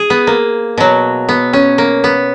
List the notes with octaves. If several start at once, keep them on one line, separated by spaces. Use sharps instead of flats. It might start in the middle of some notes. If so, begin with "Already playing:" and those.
Already playing: G#4
B3
A#3
B2 F#3
B3
C#4
A#3
B3